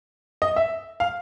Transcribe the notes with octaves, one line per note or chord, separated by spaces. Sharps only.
D#5
E5
F5